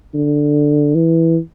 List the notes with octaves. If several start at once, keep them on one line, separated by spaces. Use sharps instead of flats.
D3
E3